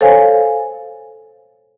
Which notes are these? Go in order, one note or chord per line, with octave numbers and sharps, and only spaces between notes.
A4 C5 C#5 F5 G#5